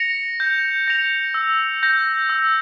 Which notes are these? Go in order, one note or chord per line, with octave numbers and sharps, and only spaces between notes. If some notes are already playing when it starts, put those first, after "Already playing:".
Already playing: A#6 C#7 F7
G6
A#6 C#7 F7
E6
G6 A#6
E6